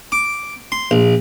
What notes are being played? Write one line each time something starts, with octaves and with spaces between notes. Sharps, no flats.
D6
C6
A#1